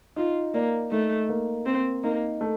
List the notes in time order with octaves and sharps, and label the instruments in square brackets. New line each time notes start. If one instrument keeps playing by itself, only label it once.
[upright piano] D#4 [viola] F4
[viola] A#3 [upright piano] D5
[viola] A3 [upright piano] D#4
[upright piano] A#3
[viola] C4 [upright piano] A#4
[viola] A#3 [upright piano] D#4
[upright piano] A3